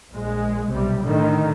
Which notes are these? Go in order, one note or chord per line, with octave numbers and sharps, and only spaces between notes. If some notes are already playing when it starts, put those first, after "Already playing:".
A#1 G#3
B1 C3 G3
A2 D3 D#3